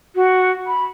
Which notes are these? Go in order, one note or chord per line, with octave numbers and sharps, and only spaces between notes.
F#4
B5